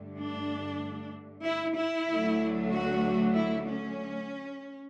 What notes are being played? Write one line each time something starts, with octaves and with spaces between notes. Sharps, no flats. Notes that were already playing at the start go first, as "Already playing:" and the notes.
Already playing: G2 D3 A3
D4
E4
E4
D2 D3 F#3 A3
F#4
E4
C#4